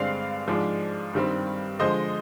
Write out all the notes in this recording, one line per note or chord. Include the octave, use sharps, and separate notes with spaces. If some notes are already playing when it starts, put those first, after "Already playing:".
Already playing: G2 D3 G#3 C4 D5 F5
G#2 F3 G#3 D4
G2 D#3 G3 C4
D3 F3 G#3 C5 D#5